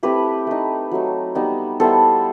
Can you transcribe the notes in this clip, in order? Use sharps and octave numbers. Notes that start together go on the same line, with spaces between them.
A3 C4 E4 G4 B4
A3 D#4
F#3 A3 D#4
G3 B3 D#4
G3 B3 E4 A4 C5